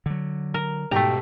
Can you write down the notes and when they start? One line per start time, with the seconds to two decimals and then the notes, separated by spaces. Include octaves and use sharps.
0.06 D3 F#3
0.54 A#4
0.91 G#2 B2 A3 G4 A#5